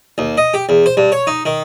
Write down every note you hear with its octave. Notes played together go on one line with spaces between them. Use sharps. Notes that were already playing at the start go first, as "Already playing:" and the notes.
D#2
D#5
G4
E2
C5
G2
C#5
D#4
D#3